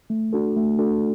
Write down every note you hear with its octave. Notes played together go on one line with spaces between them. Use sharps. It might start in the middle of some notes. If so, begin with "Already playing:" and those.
A3
D4 F#4 A4
A3
D4 F#4 A4